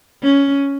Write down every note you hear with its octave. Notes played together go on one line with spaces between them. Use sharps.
C#4